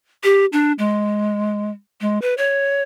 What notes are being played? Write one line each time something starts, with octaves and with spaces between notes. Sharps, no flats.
G4
D4
G#3
G#3
B4
C#5